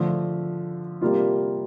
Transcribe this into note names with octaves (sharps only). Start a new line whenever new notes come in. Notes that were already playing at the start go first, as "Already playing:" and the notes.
Already playing: D3 F3 A3
C3 G3 A#3 F4